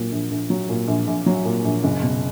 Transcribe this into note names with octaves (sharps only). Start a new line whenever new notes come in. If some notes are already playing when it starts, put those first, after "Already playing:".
Already playing: A#2 F#3
A#1
A#1
F#3
A#2
A#1
A#1
F#3
A#2
A#1
F#1
B2